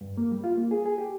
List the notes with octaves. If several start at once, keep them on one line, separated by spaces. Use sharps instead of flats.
G2
A#3
G3
F4
A#3
G#4
G#4
G4